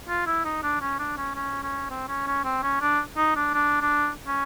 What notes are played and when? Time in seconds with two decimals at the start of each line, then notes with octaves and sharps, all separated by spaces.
0.09 F4
0.27 E4
0.45 D#4
0.63 D4
0.81 C#4
0.99 D4
1.17 C#4
1.35 C#4
1.63 C#4
1.90 C4
2.08 C#4
2.27 C#4
2.44 C4
2.63 C#4
2.81 D4
3.17 D#4
3.36 D4
3.54 D4
3.82 D4
4.27 C#4